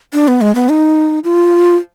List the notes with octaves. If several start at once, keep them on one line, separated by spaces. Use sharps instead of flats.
D4
B3
G#3
B3
D#4
F4